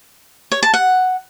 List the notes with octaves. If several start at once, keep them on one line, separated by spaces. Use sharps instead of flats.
C#5
A5
F#5